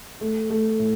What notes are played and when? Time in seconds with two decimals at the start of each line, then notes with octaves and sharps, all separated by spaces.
0.21 A3
0.50 A3
0.79 A2